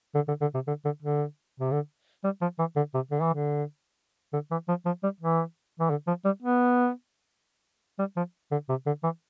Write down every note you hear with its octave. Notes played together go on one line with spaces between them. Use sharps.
D3
D3
D3
C3
D3
D3
D3
C3
D3
G3
F3
E3
D3
C3
D3
E3
D3
D3
E3
F3
F3
G3
E3
E3
D3
F3
G3
B3
G3
F3
D3
C3
D3
E3